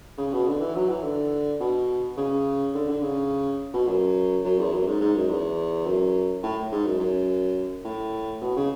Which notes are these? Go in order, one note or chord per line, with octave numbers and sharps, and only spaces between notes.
C#3
B2
D3
E3
F#3
E3
D3
B2
C#3
D3
D3
C#3
B2
F#2
F#2
E2
F#2
G#2
G#2
F#2
E2
F#2
A2
G#2
F#2
F#2
A2
B2
C#3